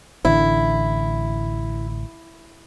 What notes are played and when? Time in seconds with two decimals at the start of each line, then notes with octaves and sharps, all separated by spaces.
0.25 A1 D3 E4